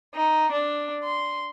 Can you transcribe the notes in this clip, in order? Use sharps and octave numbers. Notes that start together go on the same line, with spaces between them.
D#4
D4
C6